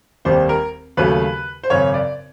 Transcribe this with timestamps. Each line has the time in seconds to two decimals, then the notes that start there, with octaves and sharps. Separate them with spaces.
0.25 F1 D#2 D#3 G3 C5
0.49 A#4
0.97 D#2 C#3 F#3 A3 B4
1.63 C5
1.70 G#1 F#2 C#3 C#5
1.94 D5